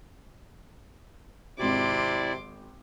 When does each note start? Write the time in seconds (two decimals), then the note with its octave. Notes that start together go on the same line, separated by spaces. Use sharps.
1.59 G#1 C3 E4 F#4 D5 C6 D6